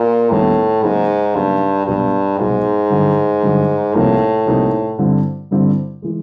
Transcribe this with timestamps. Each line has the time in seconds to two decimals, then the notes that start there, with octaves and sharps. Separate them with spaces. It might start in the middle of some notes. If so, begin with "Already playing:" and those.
Already playing: A#2
0.31 D#2 A2 D#3 G3 B3 D4
0.82 G#2 C#3 F#3 A#3 D#4
1.35 G2 C#3 F#3 A#3 D#4
1.86 C2 G2 B2 F#3 B3
2.38 C2 G#2 B2 F#3 B3
2.90 G2 D3 F#3
3.43 G2 D3 F#3
3.95 C2 A2 C3 F3 A#3 D#4
4.46 C2 C3 F3 A#3 D#4
4.99 G2 D3 G3 C4 E4
5.51 G2 D3 G3 C4 E4
6.02 E3 G#3